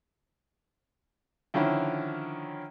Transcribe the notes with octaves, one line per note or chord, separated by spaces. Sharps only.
D3 D#3 F3 C#4 E4